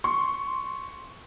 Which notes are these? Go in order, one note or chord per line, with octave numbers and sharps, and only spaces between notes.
C6 C#6